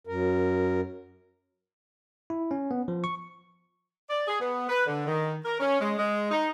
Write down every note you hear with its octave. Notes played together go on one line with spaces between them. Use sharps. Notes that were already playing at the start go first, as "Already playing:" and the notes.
F#2 A#4
E4
C#4
B3
F3
C#6
D5
G#4
B3
B4
D3
D#3
A#4
C#4
G#3
G#3
D#4